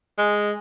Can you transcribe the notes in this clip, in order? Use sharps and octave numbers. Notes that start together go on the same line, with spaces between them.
G#3